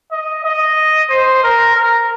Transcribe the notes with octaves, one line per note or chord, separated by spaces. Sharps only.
D#5
D#5
C5
A#4
A#4